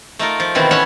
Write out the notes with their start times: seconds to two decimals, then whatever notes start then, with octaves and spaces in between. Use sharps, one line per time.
0.19 A3 D#4 F4 A#4
0.40 F3
0.55 B2 D#3 E3 C4
0.71 B3 C#4 C#5 E5 F#5